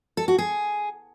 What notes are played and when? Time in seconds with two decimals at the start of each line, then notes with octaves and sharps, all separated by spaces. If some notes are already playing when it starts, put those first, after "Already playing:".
0.17 A4
0.28 F#4
0.38 G#4